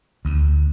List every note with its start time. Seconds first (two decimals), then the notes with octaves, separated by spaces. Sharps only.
0.25 D2